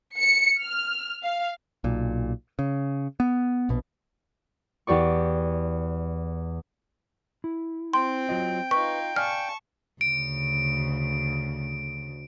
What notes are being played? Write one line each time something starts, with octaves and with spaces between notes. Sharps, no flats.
C#7
F6
F5
B1 A#2
C#3
B3
A#1 B2
E2 G4 D5 C#6
E4
C4 G5 C6
F#3 F4 D#5
D#4 F4 B4 C#6
D5 F5 G#5 A5 C#6 F6
D2 C#3 D7